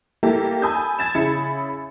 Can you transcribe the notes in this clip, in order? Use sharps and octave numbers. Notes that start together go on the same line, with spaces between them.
A#3 E4 G4 A4
G#5 A5 B5 D#6 E6 G6
G#6 A6 E7
C#3 E4 B5 C#7